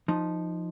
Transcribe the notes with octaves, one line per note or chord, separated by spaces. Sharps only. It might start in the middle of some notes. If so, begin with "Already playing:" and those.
F3 D#4